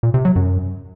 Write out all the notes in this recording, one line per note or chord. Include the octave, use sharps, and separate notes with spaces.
A#2
C3
F#3
F#2